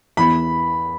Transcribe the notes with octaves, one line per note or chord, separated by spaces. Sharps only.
E2 E3 B5